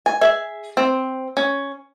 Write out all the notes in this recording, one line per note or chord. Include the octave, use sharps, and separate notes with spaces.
G#5
G#4 E5
C4
C#4